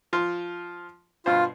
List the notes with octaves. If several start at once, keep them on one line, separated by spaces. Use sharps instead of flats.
F3 F4 C6
G2 B2 F4 C5